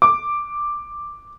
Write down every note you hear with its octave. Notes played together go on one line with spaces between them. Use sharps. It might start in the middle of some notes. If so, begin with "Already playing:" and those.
D6